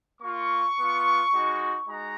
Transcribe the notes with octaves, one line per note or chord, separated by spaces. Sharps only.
A#3 F4 C#6
B3
F4
G#3 D#4 F#4
G#3 D#4 F#4 A#5